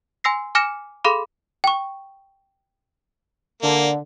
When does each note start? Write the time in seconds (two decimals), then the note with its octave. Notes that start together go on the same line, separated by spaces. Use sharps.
0.24 G#5 C6 E6 A#6 C7
0.55 G#5 D6 F6 A#6 C#7 E7
1.04 G#4 A4 F5 B5 C6 D6
1.64 G5 C#6
3.63 D3 A#3